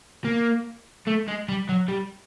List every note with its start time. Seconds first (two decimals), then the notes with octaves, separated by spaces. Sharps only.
0.25 A#3
1.07 A3
1.28 G#3
1.48 G3
1.69 F#3
1.89 G3